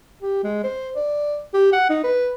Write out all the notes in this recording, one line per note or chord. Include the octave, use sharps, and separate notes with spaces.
G4
G#3
C5
D5
G4
F#5
D#4
B4